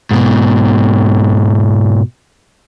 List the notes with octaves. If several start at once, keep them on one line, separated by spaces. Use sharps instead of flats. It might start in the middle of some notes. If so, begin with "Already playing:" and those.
G#2 B2